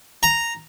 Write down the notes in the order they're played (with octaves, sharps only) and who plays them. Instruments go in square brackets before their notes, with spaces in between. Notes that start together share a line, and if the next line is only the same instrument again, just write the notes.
[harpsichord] A#5